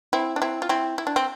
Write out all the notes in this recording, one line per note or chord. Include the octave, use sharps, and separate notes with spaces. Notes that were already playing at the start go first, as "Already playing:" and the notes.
C4 E4
D4
C4 E4
F4
C4 E4
E4
D4
C4